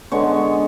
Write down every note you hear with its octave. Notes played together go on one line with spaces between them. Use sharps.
D3 G#3 B3 C#5